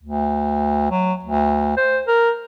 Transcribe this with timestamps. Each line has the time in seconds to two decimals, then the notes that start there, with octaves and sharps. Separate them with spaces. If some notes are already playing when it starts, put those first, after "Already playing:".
0.03 D2
0.91 F#3
1.24 D2
1.77 C5
2.07 A#4